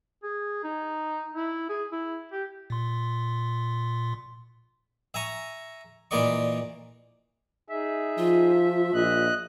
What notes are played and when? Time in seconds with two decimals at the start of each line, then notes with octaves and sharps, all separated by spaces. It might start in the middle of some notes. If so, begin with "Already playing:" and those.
0.23 G#4
0.63 D#4
1.34 E4
1.69 G#4
1.92 E4
2.32 G4
2.70 A#2 C6
5.14 E5 G#5 A#5 C#6
6.11 A#2 E3 A#3 D5 D#5 C#6
7.70 D#4 G#4 E5
8.18 F3 F4
8.94 A#1 D#5 F#6